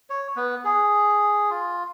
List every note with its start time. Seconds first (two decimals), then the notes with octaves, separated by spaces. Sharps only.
0.10 C#5
0.36 B3
0.64 G#4
1.50 F4